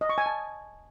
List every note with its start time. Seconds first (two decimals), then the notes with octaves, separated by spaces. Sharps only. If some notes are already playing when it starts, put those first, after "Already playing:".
0.01 D#5
0.09 C#6
0.18 G#5
0.26 A5